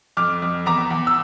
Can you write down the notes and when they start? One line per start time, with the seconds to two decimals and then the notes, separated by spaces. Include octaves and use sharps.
0.17 F2 D6 F6
0.42 F2
0.66 E2 A#5 D6
0.90 E2
1.07 E6